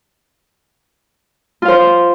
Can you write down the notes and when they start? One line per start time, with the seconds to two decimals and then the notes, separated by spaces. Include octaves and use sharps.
1.62 F4
1.65 F5
1.68 C5